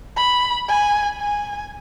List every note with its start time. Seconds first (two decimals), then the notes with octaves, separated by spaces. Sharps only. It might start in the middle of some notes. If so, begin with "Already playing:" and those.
0.17 B5
0.68 G#5
1.21 G#5